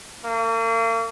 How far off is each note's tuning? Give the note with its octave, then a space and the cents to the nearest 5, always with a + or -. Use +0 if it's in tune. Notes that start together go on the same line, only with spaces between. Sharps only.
A#3 -40